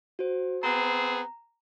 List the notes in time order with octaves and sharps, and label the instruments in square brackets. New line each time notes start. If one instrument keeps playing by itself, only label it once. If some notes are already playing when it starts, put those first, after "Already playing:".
[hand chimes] F#4 C5
[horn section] B3 C4 G#4 [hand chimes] A#5